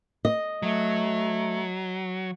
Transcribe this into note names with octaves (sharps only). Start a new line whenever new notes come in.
D#5
F#3 A3